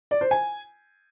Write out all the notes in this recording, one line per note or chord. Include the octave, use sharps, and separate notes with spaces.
D5
C5
G#5